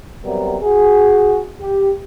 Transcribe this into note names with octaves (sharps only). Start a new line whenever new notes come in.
C3 F#3 G3 B3 A#4
F#4 G#4
G4